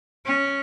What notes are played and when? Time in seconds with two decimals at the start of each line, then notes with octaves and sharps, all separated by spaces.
0.26 C#4